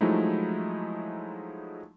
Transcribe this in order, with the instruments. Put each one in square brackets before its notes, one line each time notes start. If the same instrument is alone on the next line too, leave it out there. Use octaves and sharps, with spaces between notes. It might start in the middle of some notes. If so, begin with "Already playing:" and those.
[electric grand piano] F3 F#3 G#3 A3 D#4 E4